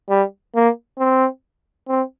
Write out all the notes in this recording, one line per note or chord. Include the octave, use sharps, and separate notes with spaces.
G3
A#3
C4
C4